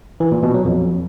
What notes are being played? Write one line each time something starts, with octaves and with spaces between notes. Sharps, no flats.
E3
A#2
B2
F#3
F2